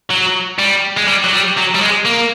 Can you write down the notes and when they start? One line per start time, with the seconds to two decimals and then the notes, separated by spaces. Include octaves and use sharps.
0.10 F#3
0.59 G3
0.97 G#3
1.08 G3
1.24 F#3
1.33 G3
1.57 F#3
1.75 G3
1.81 G#3
2.06 A#3